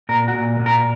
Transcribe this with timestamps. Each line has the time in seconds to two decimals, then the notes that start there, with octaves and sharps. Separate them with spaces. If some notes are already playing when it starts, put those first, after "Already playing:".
0.09 A#2 A#4
0.28 F#4
0.34 A#2
0.59 A#2
0.66 A#4